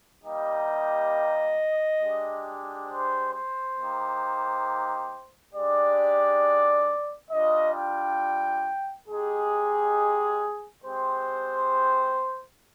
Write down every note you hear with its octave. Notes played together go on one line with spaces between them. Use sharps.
G3 A#3 D#4 G4 D#5
G#3 D4 G4
C5
C5
A#3 D#4 G4
G#3 D4 G4 D5
G3 D4 F4 D#5
G5
G#3 D#4 G4 G#4
G#3 C4 G4 C5